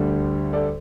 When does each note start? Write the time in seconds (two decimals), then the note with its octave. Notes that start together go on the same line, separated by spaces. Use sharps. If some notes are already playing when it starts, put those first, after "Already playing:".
Already playing: D2 D3 G3
0.53 A4 D5